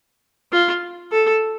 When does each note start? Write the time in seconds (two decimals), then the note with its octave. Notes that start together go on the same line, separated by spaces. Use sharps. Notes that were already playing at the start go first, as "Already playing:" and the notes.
0.52 F4
1.12 A4